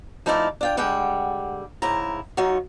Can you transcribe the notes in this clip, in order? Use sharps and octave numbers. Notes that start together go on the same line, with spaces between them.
F3 A3 D#4 E4 D5 F5
D4 F4 G5
D3 G3 G#3 F#5 G5
G#2 C#3 E4 A#5
F#3 D#4 F4 F#4